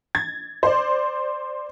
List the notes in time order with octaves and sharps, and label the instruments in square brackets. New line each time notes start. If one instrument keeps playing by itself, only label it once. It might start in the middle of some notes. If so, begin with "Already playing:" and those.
[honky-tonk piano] G#6 A6
C5 D5